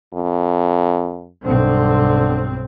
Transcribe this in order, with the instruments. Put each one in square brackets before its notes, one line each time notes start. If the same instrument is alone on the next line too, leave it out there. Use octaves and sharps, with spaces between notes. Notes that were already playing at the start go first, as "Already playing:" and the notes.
[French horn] F2
[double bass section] B1 G2 C4 [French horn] D3